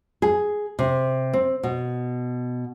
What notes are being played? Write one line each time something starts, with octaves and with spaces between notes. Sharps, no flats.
G#4
C3
C4
B2